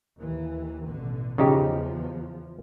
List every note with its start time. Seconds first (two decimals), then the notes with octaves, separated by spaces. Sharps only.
0.18 D#2 E3
0.86 A1 B2 D3
1.38 E2 C#3 F3 D#4 G4